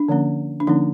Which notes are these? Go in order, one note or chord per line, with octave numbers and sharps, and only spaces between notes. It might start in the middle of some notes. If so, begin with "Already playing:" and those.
Already playing: D4
D3 F3 A#3 C#4
D4
D3 F3 A#3 C#4 D#4